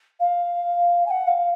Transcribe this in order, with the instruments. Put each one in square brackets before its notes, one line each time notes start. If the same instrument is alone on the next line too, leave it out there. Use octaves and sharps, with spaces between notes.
[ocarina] F5
G#5
F#5
F5